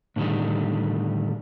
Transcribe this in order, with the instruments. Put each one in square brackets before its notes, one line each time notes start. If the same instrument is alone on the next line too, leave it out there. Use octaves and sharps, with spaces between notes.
[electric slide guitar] A2 D3 D#3 G3